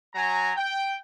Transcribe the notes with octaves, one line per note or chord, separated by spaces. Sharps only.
F#3 G#5 A#5
G5